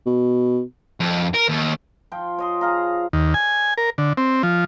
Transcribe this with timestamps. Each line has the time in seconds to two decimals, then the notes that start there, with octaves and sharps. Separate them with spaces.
0.06 B2
1.00 F2
1.34 A#4
1.49 D#2
2.12 F3 F4 G5
2.38 C#5 D#5 C6
2.61 G#4 F5 A#5
3.13 D#2
3.34 G#5
3.78 A#4
3.98 D3
4.17 C4
4.43 F3